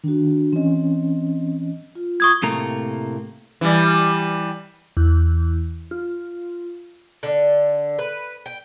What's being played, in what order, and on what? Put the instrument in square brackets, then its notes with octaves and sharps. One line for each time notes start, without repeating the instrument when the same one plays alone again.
[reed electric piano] D#3 [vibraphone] D4 F#4
[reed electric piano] E3 C#4 [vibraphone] C4 D#5
[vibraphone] F4
[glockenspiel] C#6 D#6 G#6
[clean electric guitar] A2 C3 A3 A#3 A#5
[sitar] E3 G3
[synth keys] E2
F4
[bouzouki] D3
B4
G5